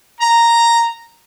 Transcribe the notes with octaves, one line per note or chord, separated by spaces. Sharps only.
A#5